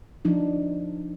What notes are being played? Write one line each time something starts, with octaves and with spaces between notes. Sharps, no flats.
F3 D4 D#4